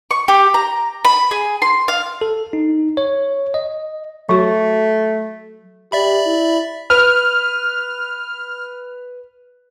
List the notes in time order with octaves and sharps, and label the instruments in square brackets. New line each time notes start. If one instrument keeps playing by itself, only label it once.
[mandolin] C#6
G4
A#5
B5
G#4
C6
F5
[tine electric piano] A4
D#4
C#5
D#5
[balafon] F#3 F#4 [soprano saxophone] A3
[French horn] G4 [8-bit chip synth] D5 E5 B5
[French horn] E4
[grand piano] B4 [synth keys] F6